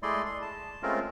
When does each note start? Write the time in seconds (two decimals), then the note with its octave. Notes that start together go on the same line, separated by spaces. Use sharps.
0.03 G#3 A3 E4 D5 D#5 C6
0.26 C6
0.42 A5
0.83 G#3 A3 C4 C#4 F4 A#4